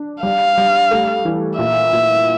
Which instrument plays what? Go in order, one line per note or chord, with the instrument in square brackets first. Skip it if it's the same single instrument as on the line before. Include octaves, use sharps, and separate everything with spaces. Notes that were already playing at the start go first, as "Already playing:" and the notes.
Already playing: [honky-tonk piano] D4
[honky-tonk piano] G3 [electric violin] F5
[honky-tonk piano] G3
A3
E3
[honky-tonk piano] A#2 [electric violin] E5
[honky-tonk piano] A#2